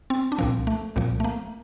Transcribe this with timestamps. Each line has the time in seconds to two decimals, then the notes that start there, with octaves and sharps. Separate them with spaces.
0.10 C4
0.32 D4
0.39 C2 A#2 F3 C4
0.67 A3
0.96 C2 A#2 F3
1.20 A3
1.24 A#3